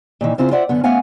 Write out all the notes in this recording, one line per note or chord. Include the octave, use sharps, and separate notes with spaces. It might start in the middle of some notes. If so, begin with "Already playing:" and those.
A#2 D#3 E3
C#3 C4 E4 F4
F4 C5 D5 E5 F#5
F#2 D3 B3
A3 B3 C#4 F5 F#5 G#5